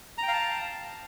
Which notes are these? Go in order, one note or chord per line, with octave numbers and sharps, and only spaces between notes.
F5 G5 A5 A#5